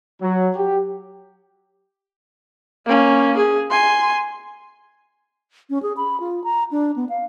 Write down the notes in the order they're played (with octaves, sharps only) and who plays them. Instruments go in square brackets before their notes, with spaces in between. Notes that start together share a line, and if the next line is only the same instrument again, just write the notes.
[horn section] F#3
G4
[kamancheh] A#3 C#4
G#4
G#5 C6
[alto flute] C#4
G#4
B5
F4
A#5
D4
B3
F5